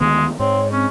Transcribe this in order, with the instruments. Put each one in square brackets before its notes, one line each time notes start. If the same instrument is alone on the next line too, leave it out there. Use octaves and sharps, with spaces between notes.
[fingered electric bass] D2 D#3 B3 [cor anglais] G#3
[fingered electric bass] G#2 [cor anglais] C4 [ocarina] C#5
[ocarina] C4 [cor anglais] C#4